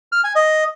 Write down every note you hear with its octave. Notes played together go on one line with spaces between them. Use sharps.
F6
G#5
D#5